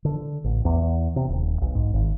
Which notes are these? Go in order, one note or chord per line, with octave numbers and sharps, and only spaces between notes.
D3
A1
E2
C3
D#1
B1
G#2
G#1